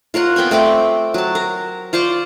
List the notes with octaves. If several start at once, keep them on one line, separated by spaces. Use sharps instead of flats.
F4 A#4 C#5 F#5
B3 C4 G5 G#5
A3 C4 D5 G5
F#3 A5
A#4
F4 C5 D5 C#6